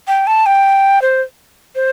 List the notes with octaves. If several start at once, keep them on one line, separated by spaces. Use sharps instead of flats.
G5
A5
G5
C5
C5